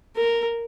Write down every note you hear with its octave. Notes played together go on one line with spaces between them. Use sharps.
A#4